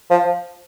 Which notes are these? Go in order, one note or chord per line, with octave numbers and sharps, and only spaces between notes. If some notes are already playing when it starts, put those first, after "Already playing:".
F3